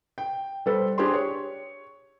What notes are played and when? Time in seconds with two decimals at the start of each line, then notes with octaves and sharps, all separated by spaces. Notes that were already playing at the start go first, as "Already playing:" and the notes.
0.18 G5
0.66 G3 A4 B4 C5
0.98 D4 G4 G#4 C5 C6
1.14 C#5